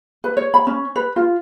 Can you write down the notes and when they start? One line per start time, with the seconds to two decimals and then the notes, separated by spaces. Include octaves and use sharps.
0.24 B4
0.37 C#5
0.54 B5
0.67 C#4
0.96 B4
1.16 F4